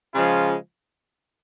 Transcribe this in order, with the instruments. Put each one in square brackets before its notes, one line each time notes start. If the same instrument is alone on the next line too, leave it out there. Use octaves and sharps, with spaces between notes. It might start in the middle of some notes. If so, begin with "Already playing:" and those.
[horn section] C#3 F3 G#3 F4